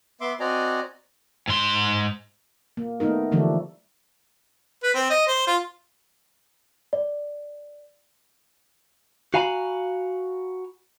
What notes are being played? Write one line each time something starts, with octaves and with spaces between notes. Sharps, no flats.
B3 E5 C6 D6
C4 F#4 D5 D#5 G#5 A#5
G#2 C6
A#3
A3 B3 D#4 A#4
D3 E3 F3 G3 A3 D4
B4
C4
D#5
C5
F4
D5
F#4 F5 G#5 A#5 B5